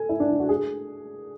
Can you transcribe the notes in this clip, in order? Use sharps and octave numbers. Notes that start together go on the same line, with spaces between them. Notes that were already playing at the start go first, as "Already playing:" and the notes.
Already playing: A4 G#5
E4
D4
E4
F#4
G#4